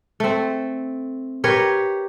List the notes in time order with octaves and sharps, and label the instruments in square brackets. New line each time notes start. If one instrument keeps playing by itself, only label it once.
[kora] A3 C4
G4 A#4 B4 C#5